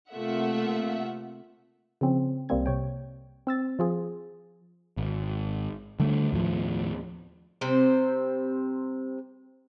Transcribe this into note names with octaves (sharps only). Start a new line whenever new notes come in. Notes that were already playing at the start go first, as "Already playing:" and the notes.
C3 A3 A#3 F4 E5 F#5
C#3 F3 C4 C#4
C2 G3 A#3 C4 G#6
C3 C#5 G5
C4 E6 A6
F3 F4 G#4
G#1
D3 G3 A3
D#2 A2 F3
C3 G3 C4 C5